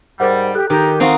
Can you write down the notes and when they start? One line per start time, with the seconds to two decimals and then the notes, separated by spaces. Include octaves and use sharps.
0.20 G#2 G3 A#4 C5 F#5
0.55 G4 A4 F#6
0.70 D#3 G4 A#5
1.00 C4 D#4 F#4 F5 C6